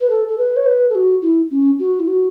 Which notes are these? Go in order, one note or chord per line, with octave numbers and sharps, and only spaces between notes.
B4
A4
A4
B4
C#5
B4
A4
F#4
E4
C#4
F#4
E4
F#4